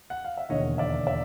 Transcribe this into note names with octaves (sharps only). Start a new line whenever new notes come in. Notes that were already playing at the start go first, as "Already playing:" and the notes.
F#5
F5
E5
E1 D#2 D3 C#5 D#5
D5 E5
D5 E5